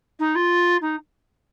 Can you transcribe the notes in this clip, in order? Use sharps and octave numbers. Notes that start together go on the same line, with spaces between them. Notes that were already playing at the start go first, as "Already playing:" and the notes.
D#4
F4
D#4